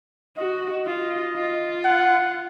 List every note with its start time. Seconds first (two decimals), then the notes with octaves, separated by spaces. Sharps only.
0.37 F#4 D#5
0.86 F4 D#5
1.36 F4
1.85 F#5